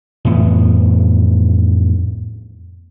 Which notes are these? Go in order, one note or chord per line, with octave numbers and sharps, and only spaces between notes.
F2 A2 E3 B3